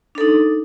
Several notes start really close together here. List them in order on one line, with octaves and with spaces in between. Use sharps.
D4 A4 D#4